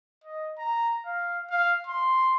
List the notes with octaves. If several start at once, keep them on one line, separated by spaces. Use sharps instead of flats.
D#5
A#5
F5
F5
C6